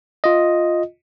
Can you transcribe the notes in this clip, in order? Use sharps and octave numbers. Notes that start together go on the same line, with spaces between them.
F4 D#5